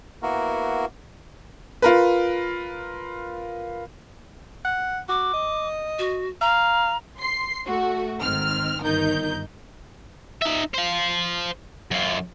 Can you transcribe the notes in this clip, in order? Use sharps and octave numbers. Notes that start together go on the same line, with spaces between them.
A#3 B3 E4 F#4 A#4
F4 A#4 B4
F#5
F#4 D6
D#5
F#4
F5 A#5
C6 C7
A3 F#4
G#1 D#3 C4 F6
G1 D#3 D#4 A#4 G6
D#4 E5
C5 F5
F#2 F4